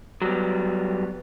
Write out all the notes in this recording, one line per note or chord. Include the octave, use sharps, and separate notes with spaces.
F#3 G3 B3